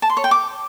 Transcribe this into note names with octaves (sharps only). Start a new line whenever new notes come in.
A5
C6
C#5
G5
D6